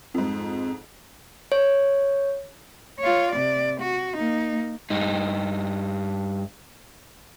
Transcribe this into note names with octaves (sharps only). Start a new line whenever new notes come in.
F2 G#2
C#5
F4 C#5
C3 D5
F#4
A#3 D#4
G2 D#4